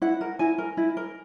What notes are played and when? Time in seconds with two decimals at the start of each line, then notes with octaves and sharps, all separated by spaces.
0.02 E4 F#5
0.21 A#4
0.39 E4 G#5
0.58 A#4
0.77 E4
0.97 A#4